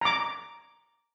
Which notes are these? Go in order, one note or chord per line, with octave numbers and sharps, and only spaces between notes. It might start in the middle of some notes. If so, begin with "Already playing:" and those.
A#5 D6